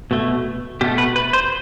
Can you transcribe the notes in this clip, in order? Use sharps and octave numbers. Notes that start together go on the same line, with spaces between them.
B2 A3
B2 A3 G4
B4
B4
C5